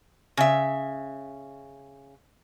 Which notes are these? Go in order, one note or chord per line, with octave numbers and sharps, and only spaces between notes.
C#3 E5